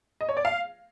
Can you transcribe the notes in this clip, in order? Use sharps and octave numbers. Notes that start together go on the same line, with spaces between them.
D#5
C#5
D5
F5